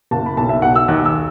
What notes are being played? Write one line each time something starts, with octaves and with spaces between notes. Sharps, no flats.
F#1 A5
B5
B1 A5
E5
B1 F#5
E6
D#2 F#6
E6